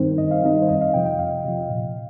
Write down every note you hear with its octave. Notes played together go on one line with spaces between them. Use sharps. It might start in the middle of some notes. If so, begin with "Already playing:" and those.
Already playing: G2 D#3 G3 C4 D#4 A#4 C5
G2 D#5
F5
D#3 G3 C4 D#4 D#5
C5
F2 D#5
F5
C3 F3 G5
G5
F2 F5
C3 F3
A#2